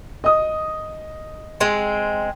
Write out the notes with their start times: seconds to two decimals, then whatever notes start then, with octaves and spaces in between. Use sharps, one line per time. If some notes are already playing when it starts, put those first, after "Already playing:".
0.24 D#5 D#6
1.60 G#3 C4